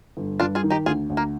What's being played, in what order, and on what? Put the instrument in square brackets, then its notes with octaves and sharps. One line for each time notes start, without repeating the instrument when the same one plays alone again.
[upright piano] G1
[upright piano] G2 [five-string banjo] D4 F4
[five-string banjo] F4 G#4
[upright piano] D#3
[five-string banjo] D#4 G4
[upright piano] D2 [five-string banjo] F4 G#4
[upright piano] D2
[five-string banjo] A#3